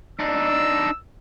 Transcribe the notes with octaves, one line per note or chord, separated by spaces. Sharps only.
D4 D#4 E6